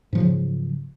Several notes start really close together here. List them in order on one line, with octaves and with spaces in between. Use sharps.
G#2 F3 F#3 C#3